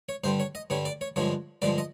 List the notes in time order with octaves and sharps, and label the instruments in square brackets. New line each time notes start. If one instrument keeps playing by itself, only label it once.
[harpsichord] C#5
G2 D3 G3 C5
C#5
D#5
G2 D3 G3 C#5
D5
C#5
G2 D3 F3 G#3 C#5
G2 D3 F3 G#3 D5
D#5